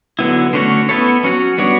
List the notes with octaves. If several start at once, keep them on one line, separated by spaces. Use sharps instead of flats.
D3 F#3 B3 E4
D3 A3 C#4 F#4 C#5
B3 E4 A4 C#5
F#3 C#4 F#4 C#5
G3 B3 D4 F#4 C#5